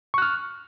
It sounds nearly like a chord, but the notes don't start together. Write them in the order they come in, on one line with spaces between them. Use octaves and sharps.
C#6 F#6 F6